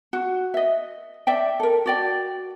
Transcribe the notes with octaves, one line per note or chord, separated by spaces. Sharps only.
F#4
D#5 E5
D5 E5 G5
A4 A#4
F#4 D5 G5